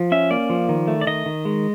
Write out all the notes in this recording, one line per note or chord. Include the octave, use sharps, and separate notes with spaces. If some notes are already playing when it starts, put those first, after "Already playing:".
Already playing: F3
C#4 E5
A#3 D5
F3
D#3
A3
D5
D#3 D#5
D#3
G#3